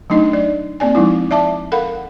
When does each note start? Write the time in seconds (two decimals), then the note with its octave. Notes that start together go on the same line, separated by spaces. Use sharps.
0.10 F#3 A3 D4 D#4 D#5
0.33 D5
0.80 A#3 C4 D5 G#5
0.95 F3 G#3 D#4 E4
1.31 D5 E5 A5 D6
1.72 A4 A#4 F5 F#5 B5